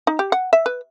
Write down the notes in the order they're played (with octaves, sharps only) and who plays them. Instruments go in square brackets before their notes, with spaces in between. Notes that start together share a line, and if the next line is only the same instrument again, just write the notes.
[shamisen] D#4
G4
F#5
E5
B4